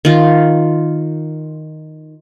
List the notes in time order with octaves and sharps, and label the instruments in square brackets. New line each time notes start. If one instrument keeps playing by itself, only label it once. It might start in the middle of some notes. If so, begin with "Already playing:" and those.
[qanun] D#3 F4